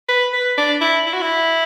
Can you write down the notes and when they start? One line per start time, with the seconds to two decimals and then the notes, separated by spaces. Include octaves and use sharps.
0.08 B4
0.33 B4
0.57 D4
0.81 E4
1.06 E4
1.14 F#4
1.22 E4